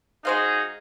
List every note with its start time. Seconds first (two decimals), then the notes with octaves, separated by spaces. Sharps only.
0.25 G#3 D#4 F#4 G#4 C5 F5